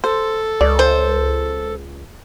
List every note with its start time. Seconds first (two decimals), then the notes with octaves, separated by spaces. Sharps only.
0.04 A4 C5
0.61 C#2 D5
0.79 C5